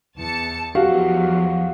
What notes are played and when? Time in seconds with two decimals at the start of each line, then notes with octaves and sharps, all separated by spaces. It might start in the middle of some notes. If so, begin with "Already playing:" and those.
0.17 E2 A5 C#7
0.75 E2 F3 F#3 F#4 G4 F5